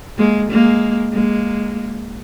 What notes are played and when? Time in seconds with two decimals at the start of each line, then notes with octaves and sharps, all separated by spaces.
0.18 G#3 A#3
0.50 G#3 A#3
1.13 G#3 A#3